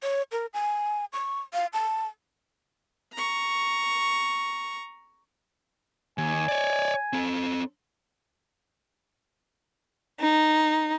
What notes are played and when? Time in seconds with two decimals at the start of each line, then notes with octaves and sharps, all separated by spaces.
0.03 C#5
0.32 A#4
0.54 G#5
1.13 C#6
1.54 F5
1.73 A5
3.14 A#5 C#6
6.18 D#2 G#5
6.48 C#5 D5
7.13 C4 A4
10.20 D#4